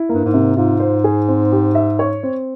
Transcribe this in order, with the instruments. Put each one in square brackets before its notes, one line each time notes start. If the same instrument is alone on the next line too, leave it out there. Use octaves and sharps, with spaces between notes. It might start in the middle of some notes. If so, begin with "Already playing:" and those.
Already playing: [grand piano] E4
[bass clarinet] G2 [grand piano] A#3
[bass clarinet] G#2
[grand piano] C3
[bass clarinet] G#2 [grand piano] F4
[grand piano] C5
G#4
C4
G4
E5
C#5
C4